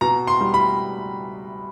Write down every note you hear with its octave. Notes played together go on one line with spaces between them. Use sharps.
B2 A#5
C6
G3
B5